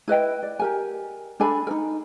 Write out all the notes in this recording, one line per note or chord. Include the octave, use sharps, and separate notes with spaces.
E4 B4 D#5 G5
D5
G4 A#4 G#5
D4 A4 G#5 B5
D#4 A#4